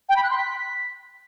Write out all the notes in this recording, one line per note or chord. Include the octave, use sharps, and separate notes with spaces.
G5
B5
F#6
C6
B6